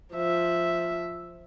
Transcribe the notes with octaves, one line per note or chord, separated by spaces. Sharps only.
F3 E5